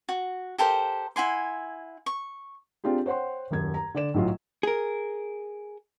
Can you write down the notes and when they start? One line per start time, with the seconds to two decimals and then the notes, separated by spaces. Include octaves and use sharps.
0.09 F#4
0.58 G4 A4 A#4 C5
1.16 E4 F#5 G#5 C6
2.06 C#6
2.84 C4 D4 F4 G4 G#4
3.06 C5 C#5 F#5 G5 C6
3.51 D#1 F#2 G#6
3.74 A#5
3.94 D3 D5 E7
4.14 B1 A2 F#3 F4
4.63 G#4 A#4